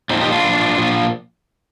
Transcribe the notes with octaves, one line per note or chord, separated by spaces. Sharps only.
A#2 F3 C4 D#4
D#4 G4
D4 F4
A#2 F3
A#2 F3